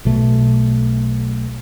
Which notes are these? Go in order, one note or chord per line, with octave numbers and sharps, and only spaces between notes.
B1 B2 A3